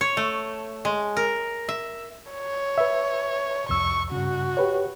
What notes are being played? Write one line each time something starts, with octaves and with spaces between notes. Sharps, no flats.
C#5
A3
G#3
A#4
E5
C#5
B4 E5
C2 F2 C#6 E6
G2 C#3 F#4
G4 B4 C#5